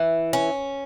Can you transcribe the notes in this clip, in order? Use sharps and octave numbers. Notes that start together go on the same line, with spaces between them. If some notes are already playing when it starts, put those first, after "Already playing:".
Already playing: E3
C#4